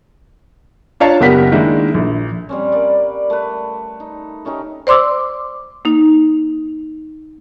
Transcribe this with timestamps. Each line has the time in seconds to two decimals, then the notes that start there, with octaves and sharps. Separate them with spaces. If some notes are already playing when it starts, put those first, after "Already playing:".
1.00 D4 F4 C#5 F5 A5 A#5
1.21 F#1 B3 G4 A#4 F#5 B6
1.52 D#3 G#3 A#3 D4 E4
1.94 A#1
2.49 G3 C4 C#4
2.72 A#3 B4 D5 D6
3.30 A3 B4
4.00 D#4
4.45 A3 C#4 D#4 G4
4.87 C5 D5 C6 D6 E6
5.85 A#3 D#4